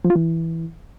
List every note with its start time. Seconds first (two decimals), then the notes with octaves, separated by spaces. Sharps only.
0.04 F3
0.10 F4
0.15 E3